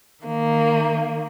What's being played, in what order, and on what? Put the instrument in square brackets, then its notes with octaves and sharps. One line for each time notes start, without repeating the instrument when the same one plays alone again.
[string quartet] D#3 A#3